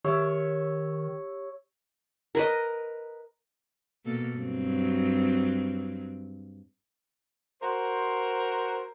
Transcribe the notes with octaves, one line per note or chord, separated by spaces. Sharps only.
D#3 G4 C#5 E5
A#4 B4 D#5
B2 A#3 A4
G2 F#3 C4
F#4 A#4 C5